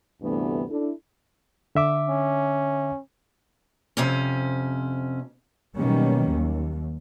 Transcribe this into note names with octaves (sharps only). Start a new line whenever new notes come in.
D2 G2 C3 E3 A3 B3
D4 E4 A4
D3 E5 D6
C#4
F2 C3 C#4
B2 D#3 F#3 G3 A#3 C#4
D#2